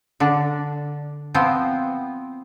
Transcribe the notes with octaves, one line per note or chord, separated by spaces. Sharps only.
D3 D4
F3 B3 C4 C5